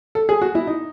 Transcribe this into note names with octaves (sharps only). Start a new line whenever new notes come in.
A4
G#4
F#4
E4
D#4